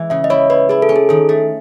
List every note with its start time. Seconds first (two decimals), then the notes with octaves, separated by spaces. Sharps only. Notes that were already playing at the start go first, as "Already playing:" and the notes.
Already playing: E3 G#3
0.10 C#3 E5
0.24 D#5
0.30 E4 C#5
0.50 E4 B4
0.69 E4 G#4
0.82 A4
0.89 C#4
0.96 G#4
1.09 D#3 A4
1.29 A3